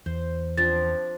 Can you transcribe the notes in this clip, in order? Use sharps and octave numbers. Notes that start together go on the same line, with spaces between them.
E2 C5
F3 C4 D4 A6